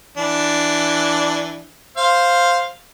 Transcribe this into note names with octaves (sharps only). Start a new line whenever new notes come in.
E3 D4
C5 F5